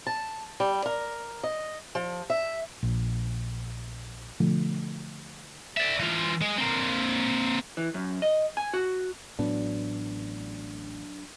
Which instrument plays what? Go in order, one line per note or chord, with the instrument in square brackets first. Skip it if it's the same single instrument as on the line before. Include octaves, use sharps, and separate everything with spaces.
[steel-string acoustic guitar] A5
G3
A#4
D#5
F3
E5
[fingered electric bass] A#1
B2 D3 F3 A3
[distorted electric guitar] D5 E5
E3 F4
G#3
A#3 C4
[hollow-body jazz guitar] E3
F#2
D#5
G#5
F#4
[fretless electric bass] A1 A2 B3 [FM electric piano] F#3 D4